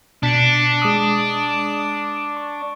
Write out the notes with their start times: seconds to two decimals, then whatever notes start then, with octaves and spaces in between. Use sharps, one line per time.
0.23 B2 D4 B6 C#7
0.82 G#3 D6 D#6
2.37 C#6